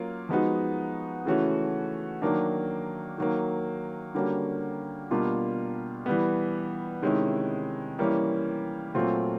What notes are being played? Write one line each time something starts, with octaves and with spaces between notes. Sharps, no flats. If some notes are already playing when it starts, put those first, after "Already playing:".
Already playing: F#3 A#3 C#4 F4
F3 G#3 B3 D#4 F#4
C#3 E3 A3 C#4 F#4
D#3 F#3 A#3 D4
D#3 F#3 A#3
D3 G3 A#3 C#4 F#4
B2 G3 A#3 D4 F4
E3 G3 B3
C3 D#3 G#3 C#4 E4
E3 G3 A#3 C#4 E4
A#2 F#3 A3 C4 F4